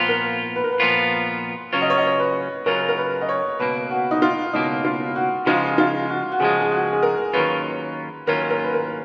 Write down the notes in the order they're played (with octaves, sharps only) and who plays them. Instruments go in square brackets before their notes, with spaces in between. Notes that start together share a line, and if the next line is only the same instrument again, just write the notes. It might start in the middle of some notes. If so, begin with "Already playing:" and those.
Already playing: [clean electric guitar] A#2 F3 B3 F4
[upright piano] A#4
B4
A#4
B4
[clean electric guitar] A#2 F3 B3 F4
[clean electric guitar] C#3 F#3 C#4 F4 [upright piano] C#5
[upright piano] D#5
C#5
D#5
C#5
B4
[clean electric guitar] C#3 F#3 C#4 F4 [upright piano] A#4
[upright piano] A#4
B4
D#5
C#5
[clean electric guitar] C#2 B2 A#3 [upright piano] B4
[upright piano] F#4
D#4
F4
[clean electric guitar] C#2 B2 A#3 [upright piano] D#4
[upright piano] F4
F#4
[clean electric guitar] C#3 F3 G#3 [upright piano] F4
[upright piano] F4
F#4
F#4
[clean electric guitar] C#3 F3 G#3 [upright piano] G#4
[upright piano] G#4
F#4
G#4
A#4
[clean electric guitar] D#2 D#3 F#3 C#4 F4 [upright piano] B4
[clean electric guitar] D#2 D#3 F#3 C#4 F4 [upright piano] A#4
[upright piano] A#4
B4
A#4